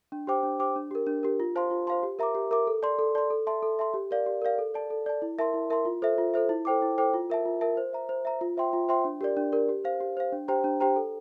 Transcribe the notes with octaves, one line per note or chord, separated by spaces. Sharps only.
D4
G4 C5 G5 D6
D4
G4 C5 G5 D6
D4
G4 A#4
D4
G4 A#4
F4
C5 F5 A5 C6
F4
C5 F5 A5 C6
G4
A#4 E5 A#5 D6
G4
A#4 E5 A#5 D6
A4
D5 A5 C6
A4
D5 A5 C6
A4
E5 A5 C6
A4
E5 A5 C6
G4
A#4 D5 F5
G4
A#4 D5 F5
A4
D5 A5
A4
D5 A5
E4
A#4 E5 A5 C6
E4
A#4 E5 A5 C6
F4
A4 C5 E5
F4
A4 C5 E5
E4
A4 C5 G5 D6
E4
A4 C5 G5 D6
F4
A#4 E5 A5
F4
A#4 E5 A5
C5
E5 A#5
C5
E5 A#5
F4
C5 E5 G5 C6
F4
C5 E5 G5 C6
D4
G4 A#4 D5
D4
G4 A#4 D5
G4
C5 F5
G4
C5 F5
D4
G4 C5 G5 A#5
D4
G4 C5 G5 A#5
A4